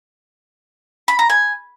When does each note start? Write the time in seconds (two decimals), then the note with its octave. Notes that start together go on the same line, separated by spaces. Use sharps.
1.08 B5
1.19 A#5
1.30 G#5